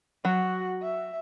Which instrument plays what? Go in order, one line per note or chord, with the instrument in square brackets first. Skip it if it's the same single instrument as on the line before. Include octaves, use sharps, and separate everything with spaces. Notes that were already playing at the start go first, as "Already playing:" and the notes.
[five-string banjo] F#3 [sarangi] F#4
[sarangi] E5